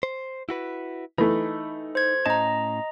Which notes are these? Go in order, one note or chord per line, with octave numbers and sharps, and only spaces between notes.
C5
E4 F#4 B4
E3 A3 D#4 B5
C5 G#6
A2 C#4 D#5 A5 A#5